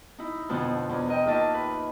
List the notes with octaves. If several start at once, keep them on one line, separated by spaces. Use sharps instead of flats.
D#4 E4
F2 B2 D3 F3 F4
E2
A#4 D#5 G5
D#2 F4 D#5 E5 A5
B4